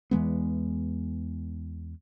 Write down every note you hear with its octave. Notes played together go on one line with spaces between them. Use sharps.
E2 E3 G#3 B3